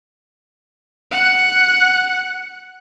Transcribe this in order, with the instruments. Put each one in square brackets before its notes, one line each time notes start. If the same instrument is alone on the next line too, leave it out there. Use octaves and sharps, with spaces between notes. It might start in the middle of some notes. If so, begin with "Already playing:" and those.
[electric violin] F#5 F#6